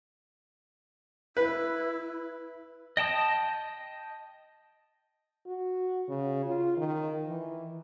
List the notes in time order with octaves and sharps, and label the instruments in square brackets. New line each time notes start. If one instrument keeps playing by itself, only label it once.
[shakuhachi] E4 [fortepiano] B4
[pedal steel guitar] D#5 G5 A5 D#6
[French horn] F#4
C#3
F4
D#3
E3